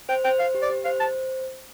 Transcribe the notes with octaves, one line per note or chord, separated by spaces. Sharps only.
C5 G5
C5 G5
C5 F5
G4
D5
G4
C5 F5
A5
C5